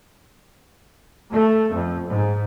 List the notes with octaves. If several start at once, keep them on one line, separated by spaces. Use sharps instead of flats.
A3
F2
G#2